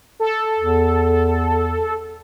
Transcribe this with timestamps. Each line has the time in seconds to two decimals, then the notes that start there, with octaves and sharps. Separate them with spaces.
0.20 A4
0.58 E2